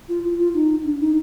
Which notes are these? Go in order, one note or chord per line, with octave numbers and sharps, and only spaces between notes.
F4
F4
F4
D#4
D4
D#4